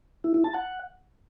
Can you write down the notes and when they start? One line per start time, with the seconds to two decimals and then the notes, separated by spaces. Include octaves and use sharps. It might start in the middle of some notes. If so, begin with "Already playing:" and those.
0.24 E4
0.34 E4
0.44 A5
0.54 F#5